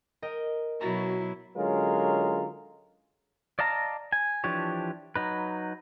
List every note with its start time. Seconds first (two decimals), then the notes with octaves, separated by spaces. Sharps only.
0.22 A#4 D#5 G5
0.81 B2 F#3 E4 F#4 A#5 B5 A6
1.57 D3 F#3 G#3 C#4 F4 A#4
3.59 D5 D#5 F5 A5 A#5
4.12 G#5
4.44 E3 F3 D4 G4 C#5
5.16 F#3 D#4 B4